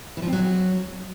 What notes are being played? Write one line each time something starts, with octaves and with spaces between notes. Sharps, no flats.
E3
F3
C4
F#3